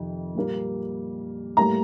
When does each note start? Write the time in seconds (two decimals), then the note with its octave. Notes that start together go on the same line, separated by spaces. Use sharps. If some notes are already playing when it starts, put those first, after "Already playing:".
Already playing: F2 C3 D#3
0.35 A#2 G3 A#3
1.57 A2 G3 A#3 A#5